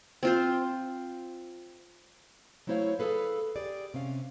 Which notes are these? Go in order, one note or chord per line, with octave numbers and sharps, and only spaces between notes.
C4 F4 C5
F#3 A3 E4 C5 C#5 F5
G#4 A4 B4 F5
G4 G#4 D5
C3 C#4 F5